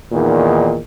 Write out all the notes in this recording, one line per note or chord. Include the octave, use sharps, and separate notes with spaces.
E2 A#2 D#3